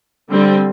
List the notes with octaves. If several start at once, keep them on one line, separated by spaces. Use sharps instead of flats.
D3 G3 C4